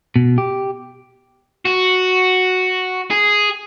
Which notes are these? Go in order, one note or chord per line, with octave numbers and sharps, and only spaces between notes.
B2
G4
F#4
G#4